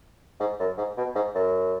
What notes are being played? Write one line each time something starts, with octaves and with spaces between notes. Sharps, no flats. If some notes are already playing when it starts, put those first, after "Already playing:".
G#2
F#2
G#2
B2
G#2
F#2